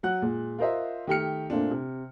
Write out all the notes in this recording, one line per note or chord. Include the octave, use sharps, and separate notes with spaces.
F#3 F#5 F#6
A#2 G#3
F4 A#4 C5 D#5 E5
D#3 A3 G4 G5 F6 C#7
A#2 A3 A#3 C4 D4
C3